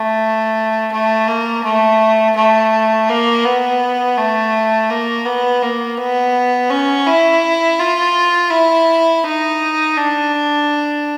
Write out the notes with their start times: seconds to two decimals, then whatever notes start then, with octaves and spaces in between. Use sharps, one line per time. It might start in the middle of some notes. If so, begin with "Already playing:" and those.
Already playing: A3
0.92 A3
1.28 A#3
1.64 A3
2.36 A3
3.09 A#3
3.45 B3
4.17 A3
4.90 A#3
5.25 B3
5.62 A#3
5.98 B3
6.70 C#4
7.07 E4
7.79 F4
8.51 E4
9.24 D#4
9.97 D4